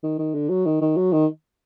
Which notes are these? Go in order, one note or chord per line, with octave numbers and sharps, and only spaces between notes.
D#3
D#3
D3
F#3
D#3
D#3
F#3
D#3